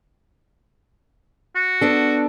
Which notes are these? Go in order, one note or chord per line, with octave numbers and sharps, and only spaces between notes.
F#4
B3 D4 A4